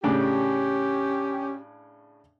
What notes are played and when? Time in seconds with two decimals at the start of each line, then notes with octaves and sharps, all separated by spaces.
0.04 A2 C#3 C#4 D4 G4